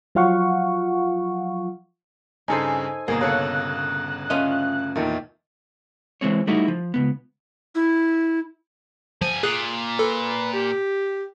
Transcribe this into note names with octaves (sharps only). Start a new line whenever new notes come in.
F3 F#3 F4 F5 F#5 C#6
G2 C#3 D#4 G#4 A4 C5 G#5
G1 B2 A#3 G#4 A#5
C#3 A4 C#5 F#6
A3 C#4 F4 D#5
E2 A#2 D#3 A3
E3 G#3 C4 C#5
G3 A3 D#4 E4 F#4
F3
C#2 A#2 B3
E4
G2 F3 G#5
A#2 G#4 F#6
A4 B4
G4